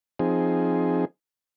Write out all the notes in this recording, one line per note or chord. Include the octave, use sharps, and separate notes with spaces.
F3 C4 D#4 G#4